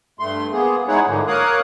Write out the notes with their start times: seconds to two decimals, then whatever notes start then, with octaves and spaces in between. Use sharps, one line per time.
0.19 G2 A3 C6
0.52 A#3 B3 G#4
0.88 G#3 D#4 E4 G#4 C#5 F#5
1.06 G#2 D3 F3 A#3
1.27 A#3 A#4 C#5 F5 D#6 F#6